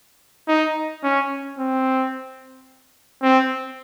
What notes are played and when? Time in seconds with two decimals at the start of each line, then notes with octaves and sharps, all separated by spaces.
0.48 D#4
1.03 C#4
1.59 C4
3.22 C4